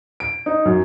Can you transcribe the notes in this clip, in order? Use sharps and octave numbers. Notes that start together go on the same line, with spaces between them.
D7
D#4
F#2